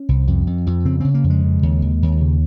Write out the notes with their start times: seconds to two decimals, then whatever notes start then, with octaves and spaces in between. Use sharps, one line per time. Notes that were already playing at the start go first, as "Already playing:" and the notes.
Already playing: C#4
0.09 C2
0.27 F2
0.47 F2
0.67 F2
0.85 C#3 C4
1.00 C#3 C4
1.14 A#3
1.24 F2
1.30 G#3
1.44 C#3
1.63 D#2
1.82 D#2
2.02 D#2
2.21 C#3